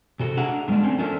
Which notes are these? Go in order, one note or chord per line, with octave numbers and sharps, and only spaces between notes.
C3 F#4 A4
D4 G#4 E5 F#5 A#5
D3 G3 G#3 A#3 D4
D3 A3 C4 C#4 A#4
F3 C#4 D4 A4 A#4 E5